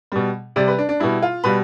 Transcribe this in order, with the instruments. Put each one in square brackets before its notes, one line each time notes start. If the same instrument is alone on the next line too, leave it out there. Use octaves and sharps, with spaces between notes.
[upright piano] B2 G3
C3 G3 D5
B4
D4
D4
B2 G3 E4
F4
B2 G3 B4